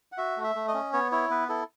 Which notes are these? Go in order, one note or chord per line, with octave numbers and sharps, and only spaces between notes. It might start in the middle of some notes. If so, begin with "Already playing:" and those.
F#5
F#4 E5
A3
E5
A3
D#5
C#4
B3 C#5
E4 C#5
B3 B4
E4 A4